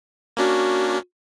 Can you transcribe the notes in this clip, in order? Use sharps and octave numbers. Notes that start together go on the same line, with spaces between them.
A#3 C#4 D4 F#4